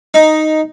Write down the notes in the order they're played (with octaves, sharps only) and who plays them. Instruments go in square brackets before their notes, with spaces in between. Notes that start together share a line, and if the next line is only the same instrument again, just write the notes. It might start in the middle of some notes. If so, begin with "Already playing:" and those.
[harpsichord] D#4